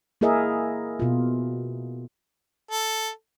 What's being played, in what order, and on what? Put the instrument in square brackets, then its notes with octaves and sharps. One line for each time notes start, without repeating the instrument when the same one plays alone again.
[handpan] A#3 E4 G#4 A#4 D#5 E5
B2 F4
[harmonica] A4